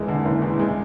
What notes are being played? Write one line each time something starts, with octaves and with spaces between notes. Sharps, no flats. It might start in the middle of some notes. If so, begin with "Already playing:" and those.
Already playing: F#1 E2 G#3
D3
F#1
E2
G#3